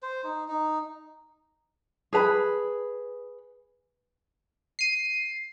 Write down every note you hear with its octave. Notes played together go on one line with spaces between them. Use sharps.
C5
D#4
D#4
G#4 B4 A#5 B5
C7 D#7